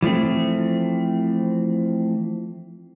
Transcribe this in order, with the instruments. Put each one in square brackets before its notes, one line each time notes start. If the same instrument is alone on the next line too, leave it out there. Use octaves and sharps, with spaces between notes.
[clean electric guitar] E3 F3 G3 A3 C4